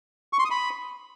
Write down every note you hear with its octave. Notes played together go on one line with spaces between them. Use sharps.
C#6
C6
D#6
B5